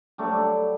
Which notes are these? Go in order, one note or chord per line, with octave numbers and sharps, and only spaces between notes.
D3 F#3 G3 A3